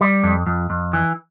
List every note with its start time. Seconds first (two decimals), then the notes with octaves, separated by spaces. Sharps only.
0.01 G3
0.23 F2
0.46 F2
0.70 F2
0.93 E3